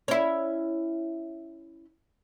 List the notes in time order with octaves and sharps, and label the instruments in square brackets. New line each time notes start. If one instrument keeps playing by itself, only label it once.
[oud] C#4 E4